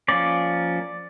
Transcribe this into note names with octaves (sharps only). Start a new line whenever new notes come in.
F3 A#3 C#4 D5